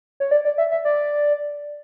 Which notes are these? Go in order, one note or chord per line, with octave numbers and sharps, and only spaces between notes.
C#5
D5
D5
E5
E5
D5